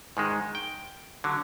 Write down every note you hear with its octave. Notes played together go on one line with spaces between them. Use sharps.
G#2 D#3 G#3
G5
D3 F#3